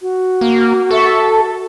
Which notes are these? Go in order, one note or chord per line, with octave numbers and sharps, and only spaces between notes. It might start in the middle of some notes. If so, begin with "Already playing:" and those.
F#4
A#3
A4 E5 C#6
A5